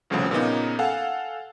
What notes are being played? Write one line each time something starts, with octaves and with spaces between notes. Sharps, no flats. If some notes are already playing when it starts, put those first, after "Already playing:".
G1 C2 A2 C#3 F3
A#2 C#3 A#3 B3 D#4
A4 F5 F#5 G#5